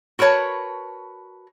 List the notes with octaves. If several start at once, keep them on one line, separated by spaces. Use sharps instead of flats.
F#4 A#4 B4 C#5 A5